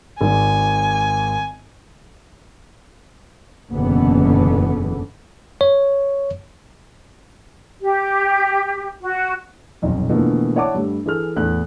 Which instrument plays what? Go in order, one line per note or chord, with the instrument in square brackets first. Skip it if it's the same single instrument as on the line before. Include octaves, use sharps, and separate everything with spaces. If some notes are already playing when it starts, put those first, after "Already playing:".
[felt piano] G#1 G#2 [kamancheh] G#5
[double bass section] F#1 E2 B2 D3 E3 B3
[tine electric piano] C#5
[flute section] G4
F#4
[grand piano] D#1 B1 F2
B2 D3 E3 F3 A3 A#3
E4 C#5 D5 F#5 A5 D6
G2 G3 A3
E3 G#4 A4 F6
E2 A2 A4 F#6